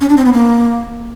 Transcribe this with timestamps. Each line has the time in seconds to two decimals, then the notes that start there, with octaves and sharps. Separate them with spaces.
0.01 C#4
0.09 D4
0.17 C4
0.25 B3
0.33 A#3